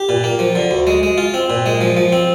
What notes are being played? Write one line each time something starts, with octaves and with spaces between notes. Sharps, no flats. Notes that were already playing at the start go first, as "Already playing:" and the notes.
Already playing: G4
A#2
A#3
F3
D3
D2
G#3
G#3
F4
C4
A#2
G#3
F3
F3
C4